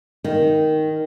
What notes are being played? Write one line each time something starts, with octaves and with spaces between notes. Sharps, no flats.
D#3